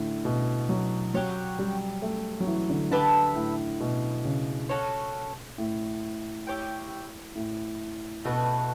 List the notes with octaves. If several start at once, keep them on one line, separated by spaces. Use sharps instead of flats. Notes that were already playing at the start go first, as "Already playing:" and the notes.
Already playing: A2 D3
B2
F#3
F#3 G4 C#5 F#5
G3
A3
F#3
E3
D3
D3 G4 B4 E5 A5
A2
B2
C#3
C#4 F#4 A4 C#5
A2
E4 G4 C#5 G5
A2
B2 A3 D4 F#4 B4